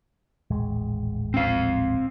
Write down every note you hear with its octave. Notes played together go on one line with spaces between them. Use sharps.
D#1 A1 G#3
C4 F5